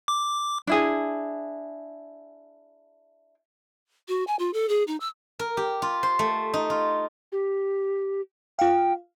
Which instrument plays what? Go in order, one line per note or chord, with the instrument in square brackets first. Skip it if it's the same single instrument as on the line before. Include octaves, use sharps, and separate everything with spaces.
[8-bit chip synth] D6
[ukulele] D4 E4 G#4
[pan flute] F#4
G#5
F4
A4
G#4
D#4
E6
[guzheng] A#4
G4
F4
C5
A3
D#4
F4
[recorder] G4
[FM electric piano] F4 F5 [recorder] G5